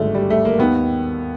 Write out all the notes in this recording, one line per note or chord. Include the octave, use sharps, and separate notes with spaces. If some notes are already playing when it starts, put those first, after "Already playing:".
Already playing: G#1 G2 D3 G#3 A3
G3
A3
A#3
D#2 D#3 B3